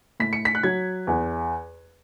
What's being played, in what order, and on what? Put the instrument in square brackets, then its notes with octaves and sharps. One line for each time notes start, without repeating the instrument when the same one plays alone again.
[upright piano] A2 B6
C#7
B6
F#6
F#3 G#6
E2